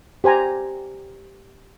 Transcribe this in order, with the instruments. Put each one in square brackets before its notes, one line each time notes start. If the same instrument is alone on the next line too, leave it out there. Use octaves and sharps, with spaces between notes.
[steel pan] G4 C5 G#5 A#5